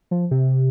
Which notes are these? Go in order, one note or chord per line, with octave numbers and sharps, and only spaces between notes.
F3
C3